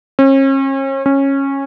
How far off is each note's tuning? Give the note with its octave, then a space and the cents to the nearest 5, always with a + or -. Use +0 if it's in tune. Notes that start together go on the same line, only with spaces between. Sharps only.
C#4 -40
C#4 -15